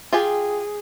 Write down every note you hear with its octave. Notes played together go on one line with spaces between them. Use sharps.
F4 G4 G#4 G#5